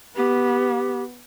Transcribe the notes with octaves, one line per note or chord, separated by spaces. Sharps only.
B3 G4